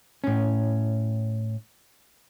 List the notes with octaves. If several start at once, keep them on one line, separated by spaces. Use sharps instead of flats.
A2 C#4